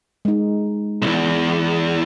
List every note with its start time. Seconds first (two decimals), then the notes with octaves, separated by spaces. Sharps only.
0.25 G#3 D#4
1.02 B1 E2